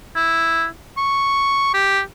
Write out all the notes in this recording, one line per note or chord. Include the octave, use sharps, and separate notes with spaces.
E4
C#6
G4